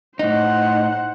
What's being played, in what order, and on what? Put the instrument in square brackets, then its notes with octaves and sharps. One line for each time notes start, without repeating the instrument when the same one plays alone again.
[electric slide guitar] A2 D#4 [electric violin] C5 F#5